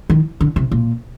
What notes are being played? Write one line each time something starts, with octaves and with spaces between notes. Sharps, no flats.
D#3
D3
C3
A#2